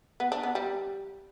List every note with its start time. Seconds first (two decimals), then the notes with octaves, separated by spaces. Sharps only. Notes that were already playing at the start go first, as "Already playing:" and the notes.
0.20 B3
0.32 D4
0.43 B3
0.55 G3